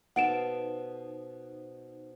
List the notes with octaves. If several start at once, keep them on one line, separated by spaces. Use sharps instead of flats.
B2 D#4 A4 C5 F5 F#5 D7 E7